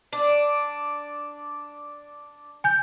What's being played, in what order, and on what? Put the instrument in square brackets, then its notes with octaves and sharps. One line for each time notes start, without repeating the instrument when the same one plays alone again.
[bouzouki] D4
[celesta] G#5 G6